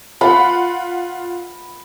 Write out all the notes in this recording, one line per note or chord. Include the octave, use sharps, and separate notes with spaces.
F4 F#5 B5